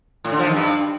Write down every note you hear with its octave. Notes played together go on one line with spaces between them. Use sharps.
A2
D3
F3
D#3
G2